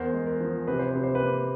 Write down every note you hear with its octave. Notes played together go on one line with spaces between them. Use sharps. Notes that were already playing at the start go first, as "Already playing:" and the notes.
Already playing: E2 A#4 C5
G#3
A#4
F3
C3 B4
C5
C3 B4
C5
B4
A#3